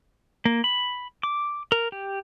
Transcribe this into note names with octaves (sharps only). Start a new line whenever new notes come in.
A#3
B5
D6
A#4
G4